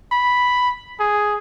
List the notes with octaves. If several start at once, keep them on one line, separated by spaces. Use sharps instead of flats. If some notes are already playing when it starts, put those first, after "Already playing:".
B5
G#4